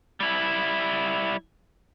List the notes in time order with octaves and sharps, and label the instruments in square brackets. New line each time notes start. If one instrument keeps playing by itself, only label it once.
[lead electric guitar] G3 E4